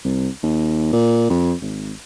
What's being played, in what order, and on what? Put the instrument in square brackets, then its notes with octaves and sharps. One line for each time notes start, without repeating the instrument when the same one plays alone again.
[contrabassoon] C2
D#2
A#2
F2
G#1